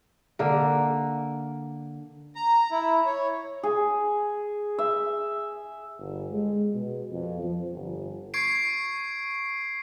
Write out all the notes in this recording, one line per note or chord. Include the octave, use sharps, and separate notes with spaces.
D3 A#3 A#4
A#5
E4
C#5
G#4
E5
G1
G#3
B2
F2
F3
G1
C#6 G#6 C7 D7